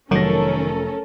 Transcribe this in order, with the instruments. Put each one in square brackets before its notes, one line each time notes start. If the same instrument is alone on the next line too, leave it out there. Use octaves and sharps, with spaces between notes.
[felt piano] F1 A#6 [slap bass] D#3 [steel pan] F#3 [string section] C#4 A4 A#4